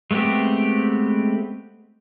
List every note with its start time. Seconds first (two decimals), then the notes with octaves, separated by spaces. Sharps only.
0.11 G#3 A3 B3 C4 G4